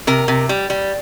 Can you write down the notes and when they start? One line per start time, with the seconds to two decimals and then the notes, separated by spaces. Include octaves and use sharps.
0.07 C3 A#4
0.28 C3
0.49 G3
0.70 G3